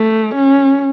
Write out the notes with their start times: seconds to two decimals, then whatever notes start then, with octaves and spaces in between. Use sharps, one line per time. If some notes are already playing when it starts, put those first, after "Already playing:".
Already playing: A3
0.35 C#4